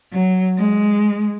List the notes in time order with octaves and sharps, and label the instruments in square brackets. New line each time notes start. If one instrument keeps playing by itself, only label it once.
[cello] F#3
G#3